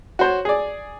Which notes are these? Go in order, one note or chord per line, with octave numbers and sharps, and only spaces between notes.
F#4 C5 C#5
G#4 D5